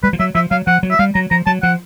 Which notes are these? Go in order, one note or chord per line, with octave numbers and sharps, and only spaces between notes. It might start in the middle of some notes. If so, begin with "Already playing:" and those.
G3 B4
F3
F#3 E5
F3 E5
F#3 F5
F3 F#5
F#3
E5
G3 F5
F#3 A#5
F3 A#5
F#3 A5
F3 F#5